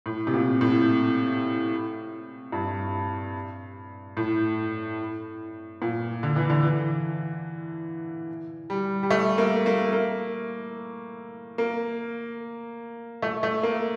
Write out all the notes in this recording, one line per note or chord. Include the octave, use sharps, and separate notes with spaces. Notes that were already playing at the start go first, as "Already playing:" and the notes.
A2
C3
A#2
A2
G2
A2
A#2
D3
E3
D3
E3
G3
G3
A3
A#3
A#3
A#3
A#3
A3
A3
A#3